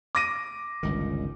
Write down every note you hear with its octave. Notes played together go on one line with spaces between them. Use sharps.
D6 A#6 D#7
G1 C#2 D#3